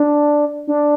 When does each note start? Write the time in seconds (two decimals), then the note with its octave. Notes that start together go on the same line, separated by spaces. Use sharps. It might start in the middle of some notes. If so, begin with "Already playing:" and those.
Already playing: D4
0.68 D4